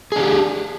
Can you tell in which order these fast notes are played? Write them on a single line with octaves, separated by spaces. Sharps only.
G#4 D4 G4